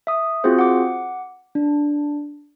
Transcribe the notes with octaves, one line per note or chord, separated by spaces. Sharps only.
E5 D#6
C4 F4 F#4 G#4 C5
F#5 D6
D4